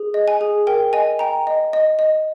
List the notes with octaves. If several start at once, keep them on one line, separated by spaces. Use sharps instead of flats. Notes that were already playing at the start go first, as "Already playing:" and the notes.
Already playing: G#4
D#5
G#5
G#4
A#4 G5
D#5 G#5
G5 A#5
D#5
D#5
D#5